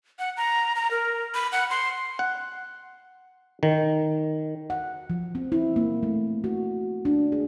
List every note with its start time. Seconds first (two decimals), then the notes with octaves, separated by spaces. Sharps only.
0.19 F#5
0.37 A#5
0.76 A#5
0.91 A#4
1.34 B5
1.52 F#5
1.70 C6
2.19 F#5
3.63 D#3
4.70 F#5
5.10 F3
5.35 C4
5.52 E4
5.76 A#3
6.03 A3
6.44 F#4
7.05 D4
7.32 G#4